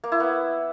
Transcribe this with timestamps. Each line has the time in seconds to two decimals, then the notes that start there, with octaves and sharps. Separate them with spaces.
0.04 A#3
0.12 E4
0.20 B3